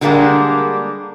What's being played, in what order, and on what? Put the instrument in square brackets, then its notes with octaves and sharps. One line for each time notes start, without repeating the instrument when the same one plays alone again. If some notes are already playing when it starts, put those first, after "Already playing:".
[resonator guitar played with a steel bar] D3 G3 G#3 A#3 D4